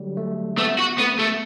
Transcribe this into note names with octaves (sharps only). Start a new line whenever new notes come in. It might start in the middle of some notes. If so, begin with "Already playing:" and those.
Already playing: D3 F#3 G3
A3
A3 B3
F#4
A3 B3
A3